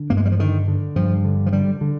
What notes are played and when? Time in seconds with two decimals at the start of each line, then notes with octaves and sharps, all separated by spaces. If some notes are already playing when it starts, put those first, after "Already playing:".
Already playing: D3
0.10 G2 A#3
0.17 G#3
0.25 G3
0.32 F3
0.39 D3 D#3
0.68 D3
0.96 G2 F3
1.24 D3
1.46 F3
1.53 D3 G3
1.81 D3